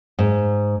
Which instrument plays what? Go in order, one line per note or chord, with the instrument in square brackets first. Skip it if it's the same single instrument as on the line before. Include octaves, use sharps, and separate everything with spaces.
[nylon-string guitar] G#2